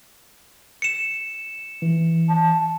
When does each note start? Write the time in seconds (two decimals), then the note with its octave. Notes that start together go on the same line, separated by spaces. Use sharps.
0.82 C#7 E7
1.82 E3
2.29 A5